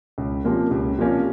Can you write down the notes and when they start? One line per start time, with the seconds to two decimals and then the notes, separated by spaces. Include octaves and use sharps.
0.18 C#2
0.44 C3 F3 A#3 C#4
0.71 C#2
0.98 C3 F3 A#3 C#4